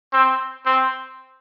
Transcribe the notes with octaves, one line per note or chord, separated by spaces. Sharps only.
C4
C4